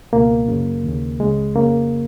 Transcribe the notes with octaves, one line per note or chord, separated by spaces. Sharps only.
C#2 B2 A#3
F#2 C#3
D#2 C#3
C#2 C#3 G#3
F2 C#3 A#3